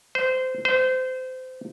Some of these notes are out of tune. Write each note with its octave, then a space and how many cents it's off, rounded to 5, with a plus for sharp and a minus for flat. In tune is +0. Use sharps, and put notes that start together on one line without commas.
C5 -20
C5 -25